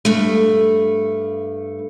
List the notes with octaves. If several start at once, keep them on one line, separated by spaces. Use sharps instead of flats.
G2 A3